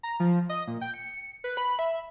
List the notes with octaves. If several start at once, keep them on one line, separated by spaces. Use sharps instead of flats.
A#5
F3
D#5
A#2
G5
C#7
B4
B5
E5